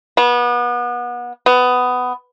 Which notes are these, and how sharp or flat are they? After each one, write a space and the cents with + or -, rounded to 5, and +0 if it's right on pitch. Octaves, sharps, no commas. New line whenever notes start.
B3 -30
B3 +15